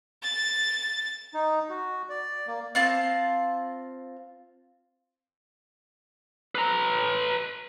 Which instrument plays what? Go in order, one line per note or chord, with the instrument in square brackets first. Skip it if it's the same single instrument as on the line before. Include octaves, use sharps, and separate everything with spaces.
[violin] A6
[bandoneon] D#4
F#4
D5
A#3
[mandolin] C4 F4 A5
[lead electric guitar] B4 A#5